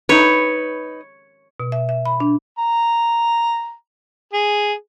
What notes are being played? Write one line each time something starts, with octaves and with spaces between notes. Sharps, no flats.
D#4 B4 C#5
B2
E5
E5
B5
D4
A#5
G#4